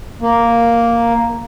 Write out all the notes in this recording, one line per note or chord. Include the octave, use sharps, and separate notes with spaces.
A#3